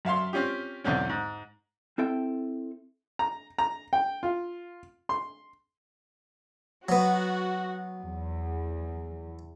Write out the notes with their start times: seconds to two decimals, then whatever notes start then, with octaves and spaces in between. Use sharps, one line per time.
0.05 F#2 E5 F5 C6
0.33 C4 C#4 F4 G4
0.84 B1 E2 D3 C4 C#4
1.09 G#2
1.98 C4 E4 A4 E5 G5
3.19 A#5
3.58 A#5
3.93 G5
4.23 F4
5.09 C6
6.89 F#3 B3 F#4
8.03 E2